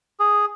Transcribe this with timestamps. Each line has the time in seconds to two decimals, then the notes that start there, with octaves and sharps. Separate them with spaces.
0.20 G#4